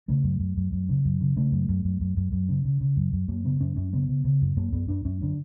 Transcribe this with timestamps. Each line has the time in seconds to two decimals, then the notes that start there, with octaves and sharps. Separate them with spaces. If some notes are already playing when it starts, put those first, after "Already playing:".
0.08 C#3 A3
0.23 F#2
0.39 F#2
0.57 F#2
0.72 F#2
0.89 C#3
1.05 F#2
1.20 C#3
1.36 C#3 A3
1.52 F#2
1.68 F#2
1.84 F#2
2.01 F#2
2.16 F#2
2.32 F#2
2.48 C#3
2.64 C#3
2.80 C#3
2.96 F#2
3.13 F#2
3.28 F#2 A#3
3.44 C#3 B3
3.60 F#2 C#4
3.76 F#2 C#4
3.93 C#3 B3
4.08 C#3
4.24 C#3
4.41 F#2
4.56 F#2 A#3
4.72 F#2 B3
4.88 F#2 D4
5.04 F#2 C#4
5.21 D3 D4